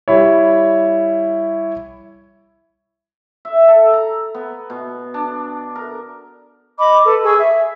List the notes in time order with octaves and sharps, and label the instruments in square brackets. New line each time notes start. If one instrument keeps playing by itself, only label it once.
[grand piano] G3 E4 C#5
[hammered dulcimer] E5
A4
A#5
B3
B2
D4
A#4
[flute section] D#5 B5 D6
A4 B4
G#4 C#6 E6
E5